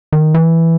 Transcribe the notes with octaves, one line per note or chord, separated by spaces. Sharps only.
D#3
E3